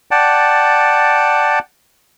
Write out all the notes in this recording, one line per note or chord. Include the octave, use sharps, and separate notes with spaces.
D5 F#5 G5 A5